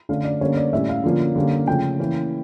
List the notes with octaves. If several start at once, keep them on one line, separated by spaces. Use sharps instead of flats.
D3 A3 C#4 F5
D5
D3 G3 A#3 C#4 C#5
D5
A2 G3 C#4 E5
F5
D3 F3 A#3 C#4
D3 G3 A#3 C#4
C#3 F3 A3 C#4 G5
E3 A#3 C#4